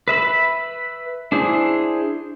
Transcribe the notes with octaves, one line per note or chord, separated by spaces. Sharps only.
B4 E5 B5
D4 E4 G#4 C5